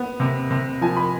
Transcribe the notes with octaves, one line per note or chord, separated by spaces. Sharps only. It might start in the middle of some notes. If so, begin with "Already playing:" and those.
Already playing: B3
C3
C3
F3 G#5
B5